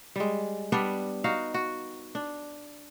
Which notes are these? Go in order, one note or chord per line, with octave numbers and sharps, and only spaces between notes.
G3 G#3
G3 B3 D4
D#4 F#4 F5
F#4
D4